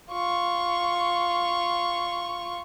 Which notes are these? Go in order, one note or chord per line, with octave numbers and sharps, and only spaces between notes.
F4 C#6